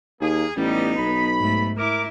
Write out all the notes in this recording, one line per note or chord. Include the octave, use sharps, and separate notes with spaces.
D#2 A#3 G#4
A1 G3 B3 D#4
B1 B5
G#2 A3
E4 A#4 D6